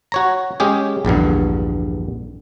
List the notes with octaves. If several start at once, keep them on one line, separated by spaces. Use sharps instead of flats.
F#4 C#5 A#5
G#3 C#4 G4 G#4
A#1 E2 G2 D3